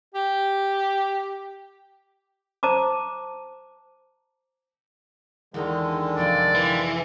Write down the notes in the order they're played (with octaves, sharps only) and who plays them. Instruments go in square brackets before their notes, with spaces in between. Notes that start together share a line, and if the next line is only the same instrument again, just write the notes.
[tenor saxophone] G4
[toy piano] C5 A5 A#5 D6
[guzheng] E2 D#4 A#5 [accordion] D3 D#3 G#3
[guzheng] F2 C3 F4 [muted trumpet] D5
[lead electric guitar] E3